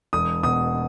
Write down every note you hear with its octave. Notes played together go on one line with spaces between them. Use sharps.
E1 D#6
B2 D#6